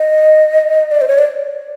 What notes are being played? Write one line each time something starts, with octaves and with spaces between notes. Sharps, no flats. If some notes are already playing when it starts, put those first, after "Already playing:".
Already playing: D#5
D5
C5
C#5
D5